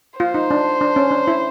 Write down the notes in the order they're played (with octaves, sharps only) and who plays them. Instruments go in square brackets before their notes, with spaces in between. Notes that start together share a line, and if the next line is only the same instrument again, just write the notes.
[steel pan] F4 [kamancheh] C5
[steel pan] D#4
D4
D4
C#4
D4
E4